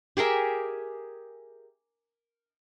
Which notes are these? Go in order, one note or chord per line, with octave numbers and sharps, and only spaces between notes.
G4 G#4 A#4 E5